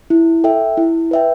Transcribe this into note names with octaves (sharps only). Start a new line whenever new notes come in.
E4
A4 E5 G5
E4
B4 E5 G5